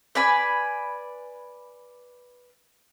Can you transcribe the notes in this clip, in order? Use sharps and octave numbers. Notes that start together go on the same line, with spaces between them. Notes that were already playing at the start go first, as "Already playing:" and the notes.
B4 D5 G#5 B5